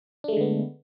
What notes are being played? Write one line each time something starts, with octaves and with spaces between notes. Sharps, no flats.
D3 G#3 A3 B3 D4